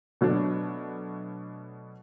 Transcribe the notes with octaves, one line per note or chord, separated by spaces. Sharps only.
B2 F#3 A3 D4